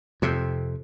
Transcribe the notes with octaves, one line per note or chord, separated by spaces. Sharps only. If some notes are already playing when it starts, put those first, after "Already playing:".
F2 C3